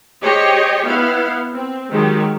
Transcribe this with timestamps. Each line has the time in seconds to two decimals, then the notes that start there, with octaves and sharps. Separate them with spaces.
0.23 G4 G#4 C5 C#5 D#5 G5
0.86 B3 E4 F5
1.54 C4
1.90 D#3 F#3 G#3 G4